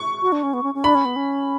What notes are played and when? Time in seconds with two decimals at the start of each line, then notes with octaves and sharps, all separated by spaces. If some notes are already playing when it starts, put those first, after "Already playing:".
Already playing: C#6
0.22 F#4
0.32 D4
0.43 C#4
0.53 B3
0.63 C#4
0.74 C#4
0.84 D4 B5
0.95 C#4
1.05 B3
1.16 C#4